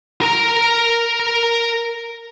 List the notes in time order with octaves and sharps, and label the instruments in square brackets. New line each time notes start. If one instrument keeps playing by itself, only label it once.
[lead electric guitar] A#4 A#5